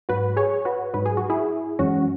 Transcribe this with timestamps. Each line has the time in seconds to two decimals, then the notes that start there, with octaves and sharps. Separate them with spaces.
0.09 G#2 F#3 F#4 B4
0.36 G#4 C#5
0.65 F#4 B4
0.94 G#2 F#3 B4
1.06 G#4
1.17 F#4
1.30 E4 G#4
1.79 F#2 E3 G#3 C#4 F#4